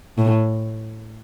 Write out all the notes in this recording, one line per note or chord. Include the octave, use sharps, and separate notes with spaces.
A2